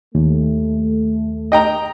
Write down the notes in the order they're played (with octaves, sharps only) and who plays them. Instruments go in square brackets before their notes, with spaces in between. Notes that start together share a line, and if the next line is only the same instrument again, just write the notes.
[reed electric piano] D#2 [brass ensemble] A3
[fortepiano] D#5 G5 A#5